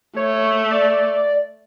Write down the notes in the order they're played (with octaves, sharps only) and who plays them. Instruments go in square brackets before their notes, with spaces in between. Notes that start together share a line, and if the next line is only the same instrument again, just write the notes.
[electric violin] A3 [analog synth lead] C#5
[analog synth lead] D5